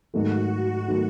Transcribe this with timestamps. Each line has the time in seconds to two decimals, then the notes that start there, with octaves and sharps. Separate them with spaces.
0.13 G#2 D#3 F#3 A3 F#4
0.51 F#4
0.87 D#3 F#3 A3